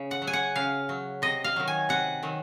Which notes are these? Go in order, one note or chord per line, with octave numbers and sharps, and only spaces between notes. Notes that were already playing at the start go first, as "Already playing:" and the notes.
Already playing: C#3
F#5
F#3
G#5
F#5
C#3 F5
F#3
C3 D#5
F5
D#3 F#3
G#5
C3 F#5
D#3 F#3